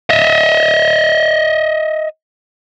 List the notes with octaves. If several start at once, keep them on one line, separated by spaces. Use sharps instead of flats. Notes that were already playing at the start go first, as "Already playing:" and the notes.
D#5 E5